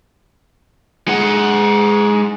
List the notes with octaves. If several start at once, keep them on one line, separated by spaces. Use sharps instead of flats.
G#3 F#5